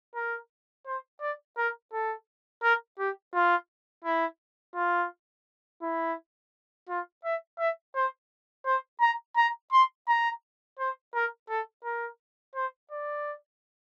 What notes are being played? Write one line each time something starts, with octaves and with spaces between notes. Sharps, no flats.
A#4
C5
D5
A#4
A4
A#4
G4
F4
E4
F4
E4
F4
E5
E5
C5
C5
A#5
A#5
C6
A#5
C5
A#4
A4
A#4
C5
D5